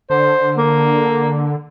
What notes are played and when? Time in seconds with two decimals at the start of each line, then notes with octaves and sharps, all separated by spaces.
0.10 D3 C5
0.57 A#3